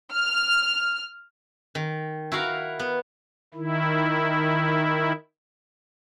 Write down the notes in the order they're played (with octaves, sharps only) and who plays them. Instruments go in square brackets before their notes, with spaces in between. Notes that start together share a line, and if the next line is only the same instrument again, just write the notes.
[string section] F6
[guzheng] D#3
E4 F#4 A#4 F5
B3
[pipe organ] D#3 E4